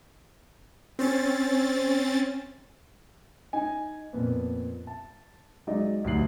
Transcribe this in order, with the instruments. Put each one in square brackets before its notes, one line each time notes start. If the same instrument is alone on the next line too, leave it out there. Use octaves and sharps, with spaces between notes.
[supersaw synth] C4 C#4 A6
[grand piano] D#4 G#5
F2 A#2 B3
A5
F#3 G#3 D#4 D5 D#5
D2 G2 F#3 D#4 C7 F#7